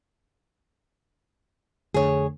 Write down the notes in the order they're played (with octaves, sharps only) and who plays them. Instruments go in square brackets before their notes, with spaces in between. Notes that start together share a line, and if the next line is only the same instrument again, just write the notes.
[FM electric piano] F2 D3 A3 [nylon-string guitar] G#4 C#5